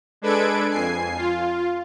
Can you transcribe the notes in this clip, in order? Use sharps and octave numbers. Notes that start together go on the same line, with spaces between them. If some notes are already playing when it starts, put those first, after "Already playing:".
G#3 D4 A4 B4 G#6 D7
F2 G#5 C7
F4